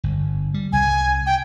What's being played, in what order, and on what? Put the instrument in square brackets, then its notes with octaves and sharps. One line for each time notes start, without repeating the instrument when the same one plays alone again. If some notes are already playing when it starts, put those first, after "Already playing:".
[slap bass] G1
G3
[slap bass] C2 [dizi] G#5
[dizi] G5